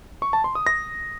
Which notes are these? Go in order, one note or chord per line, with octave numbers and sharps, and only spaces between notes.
C#6
A5
C6
D#6
A#6